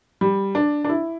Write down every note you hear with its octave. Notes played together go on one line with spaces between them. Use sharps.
G3
D4
D4
E4